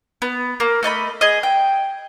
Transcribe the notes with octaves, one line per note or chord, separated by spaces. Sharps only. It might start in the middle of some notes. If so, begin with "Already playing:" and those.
B3
A#3
A3 D#5 A5 B5
G#4 D#5
G5